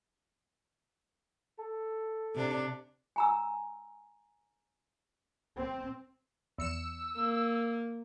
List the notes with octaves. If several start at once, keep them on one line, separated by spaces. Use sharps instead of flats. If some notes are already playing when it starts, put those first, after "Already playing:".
A4
C3 D4
G#5 A#5 E6
C4
E2 E6 C#7 E7
A#3